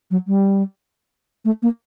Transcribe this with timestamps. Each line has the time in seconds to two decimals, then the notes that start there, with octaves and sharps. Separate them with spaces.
0.11 F#3
0.27 G3
1.45 A3
1.62 A#3